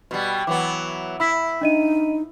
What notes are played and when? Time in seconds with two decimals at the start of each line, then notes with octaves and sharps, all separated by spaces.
0.11 B2 G3
0.47 E3 F#3 B3 D6
1.20 E4 B5 E6 B6
1.61 D4 D#4 D#5 D#7